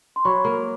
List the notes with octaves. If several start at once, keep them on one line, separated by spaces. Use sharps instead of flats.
C6
F#3 B5 C#6
A#3